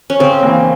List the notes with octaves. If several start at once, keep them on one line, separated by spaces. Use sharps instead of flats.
C#4
C#3 C4
E3 A#3